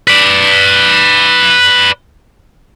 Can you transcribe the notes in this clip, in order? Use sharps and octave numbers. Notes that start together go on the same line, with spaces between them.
B4 D5